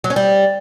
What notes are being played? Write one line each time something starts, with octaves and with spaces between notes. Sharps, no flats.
F#3
C#4
G3